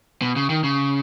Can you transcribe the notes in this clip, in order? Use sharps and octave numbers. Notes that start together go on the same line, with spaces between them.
B2
C#3
D#3
C#3